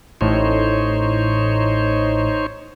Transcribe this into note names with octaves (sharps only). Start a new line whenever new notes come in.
A1 A2 D#4 C5 C#5